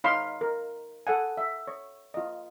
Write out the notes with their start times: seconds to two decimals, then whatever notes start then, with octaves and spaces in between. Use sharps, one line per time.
0.04 D#4 C#5 F5 B5 C6
0.41 A#4
1.07 A4 F#5 G#5
1.37 E5
1.67 C#5
2.14 F4 D#5